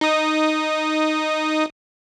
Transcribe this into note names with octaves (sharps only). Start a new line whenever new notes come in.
D#4 D#6